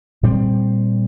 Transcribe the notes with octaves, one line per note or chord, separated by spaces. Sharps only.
A#2 G3 C4